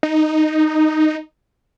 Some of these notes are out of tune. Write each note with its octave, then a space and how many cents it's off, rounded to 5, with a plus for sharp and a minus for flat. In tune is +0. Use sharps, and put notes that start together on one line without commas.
D#4 -5